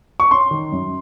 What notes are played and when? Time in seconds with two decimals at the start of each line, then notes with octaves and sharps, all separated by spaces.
0.20 C#6
0.31 C#4 C6
0.51 D#3
0.72 F#2